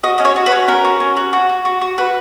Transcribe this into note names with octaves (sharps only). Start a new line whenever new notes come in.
F#4 D#5
C#4 D#5
C#5
F#4
B4
C#4
C#4 A#4
F#4
C#4
F#4
F#4
F#4
F#4
F#4
F#4 B4